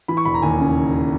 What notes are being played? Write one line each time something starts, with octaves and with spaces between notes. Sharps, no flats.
E3 B5
C#6
E1 B5
A#5
D#2 G#5
C#3